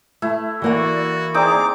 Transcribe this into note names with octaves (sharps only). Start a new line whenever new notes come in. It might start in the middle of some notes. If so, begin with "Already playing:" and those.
A3 E4
E3 A#3 F#4 D5 F#5
C4 D#4 G#4 D5 A#5 D6